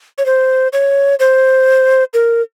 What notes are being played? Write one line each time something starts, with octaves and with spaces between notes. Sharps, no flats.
C#5
C5
C#5
C5
A#4